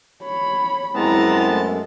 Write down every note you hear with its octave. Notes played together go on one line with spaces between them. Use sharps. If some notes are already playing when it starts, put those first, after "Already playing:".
C#5 B5
F#2 G#3 B3 C4 E4 A5 A#5
A3